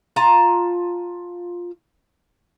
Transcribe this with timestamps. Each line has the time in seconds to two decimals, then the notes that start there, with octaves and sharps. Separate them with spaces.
0.16 F4 A5 A#5